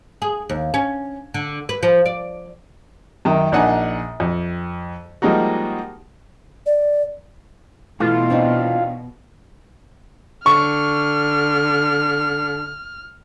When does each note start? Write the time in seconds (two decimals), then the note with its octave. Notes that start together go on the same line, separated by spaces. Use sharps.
0.22 G#4
0.49 D#2
0.74 C#4
1.34 D3
1.69 B4
1.83 F3
2.06 D5
3.25 F#2 D#3
3.52 A#1 D4 D#4 F#5 G#5
4.20 F2
5.22 F3 G3 G#3 A#3 D#4 F#4
6.66 D5
8.00 B2 E3 A3 F4
8.30 C4 D4 D#4
10.46 D3 C#6 F6